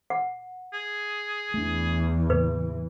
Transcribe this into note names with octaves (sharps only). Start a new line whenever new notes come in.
F#5
G#4
E2 E3 A3 D4
A2 C#3 A#3 B4